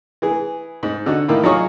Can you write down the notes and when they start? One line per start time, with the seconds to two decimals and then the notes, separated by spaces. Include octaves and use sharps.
0.22 E3 G#4
0.83 G#2
1.06 D3 D#4 F#4
1.28 A2 D#3 A#3
1.43 F#3 D#4 F4 G#4 C#5 D#5